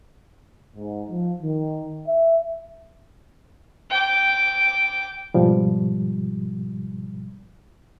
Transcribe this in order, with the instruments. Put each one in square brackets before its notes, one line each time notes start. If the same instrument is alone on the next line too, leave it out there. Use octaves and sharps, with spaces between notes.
[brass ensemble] G#2
F3
D#3
E5
[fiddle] G5 D6
[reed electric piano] G#2 B2 F3 G3